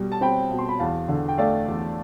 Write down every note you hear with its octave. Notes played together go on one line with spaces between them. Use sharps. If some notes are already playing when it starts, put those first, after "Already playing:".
Already playing: B2 G3
A5
C4 G5 B5
B2
C6
B5
E2 F5 A5
D3
G5
A3 D5 F5
E2